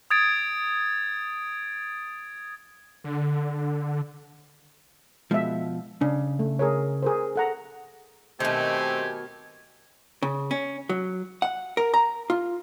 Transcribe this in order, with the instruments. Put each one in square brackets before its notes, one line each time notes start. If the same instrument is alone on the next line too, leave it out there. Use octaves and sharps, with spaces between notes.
[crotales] D#6 G#6 A6 D7
[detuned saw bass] D3
[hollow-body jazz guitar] B2 F3 [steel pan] G#3 E5
[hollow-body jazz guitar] C#3 [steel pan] D4
[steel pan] A3
G#4 A#4 C#5
G#4 A#4 C5
A4 F#5 A#5
[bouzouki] B2 D#3 [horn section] A3 C4 [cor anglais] G4 [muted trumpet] G#5
[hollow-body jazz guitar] C#3
C#4
F#3
F#5
A#4
A#5
F4